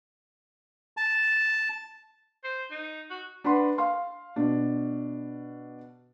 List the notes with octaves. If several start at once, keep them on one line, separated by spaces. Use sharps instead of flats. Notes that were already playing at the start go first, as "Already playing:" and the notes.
A5
C5
D#4
F#4
D4 B4 F#5 B5 C6
F5 C6
B2 D4